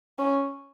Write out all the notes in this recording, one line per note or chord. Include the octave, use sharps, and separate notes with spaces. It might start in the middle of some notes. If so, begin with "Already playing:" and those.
C#4